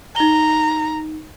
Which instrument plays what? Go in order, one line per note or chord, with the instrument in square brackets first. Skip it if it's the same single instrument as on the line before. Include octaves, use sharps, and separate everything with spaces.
[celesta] D#4 G7 [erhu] A#5